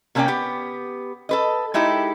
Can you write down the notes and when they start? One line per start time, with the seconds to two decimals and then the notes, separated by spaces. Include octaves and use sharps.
0.15 C3 A#3 C#4 D#4 D5 G5
0.28 B3 G4
1.29 A4 B4 D#5
1.74 G#3 D#4 E4 G4 A4